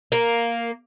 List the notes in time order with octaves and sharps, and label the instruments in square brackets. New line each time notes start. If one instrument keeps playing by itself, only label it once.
[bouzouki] A#3